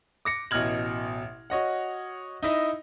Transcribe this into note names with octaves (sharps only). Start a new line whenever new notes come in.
D6 A#6 C#7
A1 B2 D#5 F6 G#6 F#7
F#4 C#5 D#5 F#5
D#4 E4 D#5